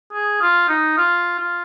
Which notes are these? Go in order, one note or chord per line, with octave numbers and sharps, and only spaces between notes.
G#4
F4
D#4
F4
F4